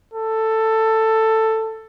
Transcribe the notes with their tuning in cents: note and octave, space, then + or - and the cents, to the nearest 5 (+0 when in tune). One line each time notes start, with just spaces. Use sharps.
A4 +10